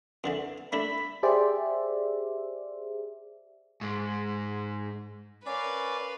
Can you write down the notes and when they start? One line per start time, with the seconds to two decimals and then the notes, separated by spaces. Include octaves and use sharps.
0.24 F2 D3 E3
0.73 A3 D4 E4 B5
1.23 G4 G#4 C5 D5 E5
3.81 G#2
5.46 C#4 A#4 B4 D5 F5